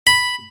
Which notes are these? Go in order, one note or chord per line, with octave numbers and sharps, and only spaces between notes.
B5